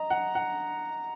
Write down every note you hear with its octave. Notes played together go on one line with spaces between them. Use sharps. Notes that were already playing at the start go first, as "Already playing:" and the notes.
Already playing: D#5 A#5
F#5
F#5